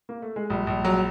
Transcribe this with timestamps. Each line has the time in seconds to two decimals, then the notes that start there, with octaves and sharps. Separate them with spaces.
0.09 A#3
0.22 A3
0.36 G#3
0.50 A#1 G3
0.67 A#1
0.85 F#3 G#3